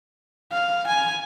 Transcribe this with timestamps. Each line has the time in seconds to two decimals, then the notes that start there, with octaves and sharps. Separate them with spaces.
0.52 F5
0.87 G#5